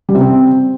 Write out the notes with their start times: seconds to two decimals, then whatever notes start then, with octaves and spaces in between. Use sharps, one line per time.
0.09 G3
0.15 C3
0.21 C4